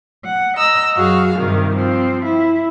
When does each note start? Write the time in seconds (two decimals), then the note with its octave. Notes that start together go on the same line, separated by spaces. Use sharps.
0.24 F#5
0.57 D#5 A#5 E6 A#6
0.96 F#2 F#4 G#4 F5
1.36 G2 C3 D#3
1.76 F3 C4
2.26 E4